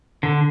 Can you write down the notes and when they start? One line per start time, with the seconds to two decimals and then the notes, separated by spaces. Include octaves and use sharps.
0.23 D3